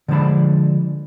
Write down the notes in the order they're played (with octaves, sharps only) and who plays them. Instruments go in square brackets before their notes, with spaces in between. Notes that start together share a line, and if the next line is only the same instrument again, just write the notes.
[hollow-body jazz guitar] D3 F3 G#3 D4 A5 B5